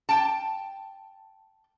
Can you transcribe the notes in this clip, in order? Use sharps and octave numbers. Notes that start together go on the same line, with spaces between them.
G5 A5